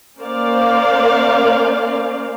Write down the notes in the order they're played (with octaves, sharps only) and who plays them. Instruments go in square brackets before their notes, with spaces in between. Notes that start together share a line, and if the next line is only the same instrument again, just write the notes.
[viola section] A#3 C#4 A#4 C5 D5 F5